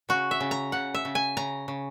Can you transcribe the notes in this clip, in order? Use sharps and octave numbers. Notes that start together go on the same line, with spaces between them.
C#3 F#4
E5
C#3
A#5
C#3 F#5
E5
C#3
G#5
C#3 A#5
C#3